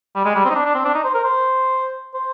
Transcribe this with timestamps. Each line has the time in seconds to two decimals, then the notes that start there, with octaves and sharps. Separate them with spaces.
0.15 G3
0.25 G#3
0.35 G3
0.45 C4
0.50 D#4
0.55 D4
0.65 D4
0.75 C4
0.85 D4
0.94 D#4
1.04 C5
1.14 A#4
1.24 C5
2.14 C5